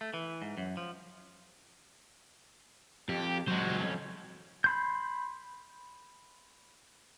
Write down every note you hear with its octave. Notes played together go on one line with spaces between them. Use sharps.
A3
E3
G#2
F#2
F3
F2 G4
F#3 G#3 F#4 C5
F2 C#4
B5 C6 G6